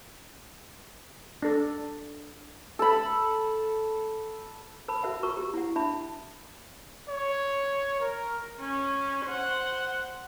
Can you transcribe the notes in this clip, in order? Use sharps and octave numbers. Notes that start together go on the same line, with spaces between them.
D4 A4
A4 B5
A#4 A5 B5
F#4 A#4 E5 F#5
F4 F#4 A#4 A#5 C#6
G4
E4 F#5
D4 E5 A5 B5
C#5
A#4
C#4
C5 F#5